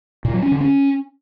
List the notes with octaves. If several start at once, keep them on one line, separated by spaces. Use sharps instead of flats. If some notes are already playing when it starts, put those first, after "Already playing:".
A#2
F#3
C#4
D3
C#4